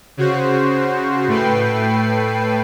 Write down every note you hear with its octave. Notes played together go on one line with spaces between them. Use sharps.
C#3 F#4 C5
A2 A3 B4 G5 C7